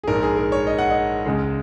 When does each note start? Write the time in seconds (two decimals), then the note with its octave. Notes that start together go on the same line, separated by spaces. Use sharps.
0.04 G#4
0.07 A#1 G#2 G#3 A#4
0.22 G#4
0.37 A#4
0.52 C#5
0.67 D#5
0.78 F#5
0.91 D#5
1.26 C#2 C#3 G#3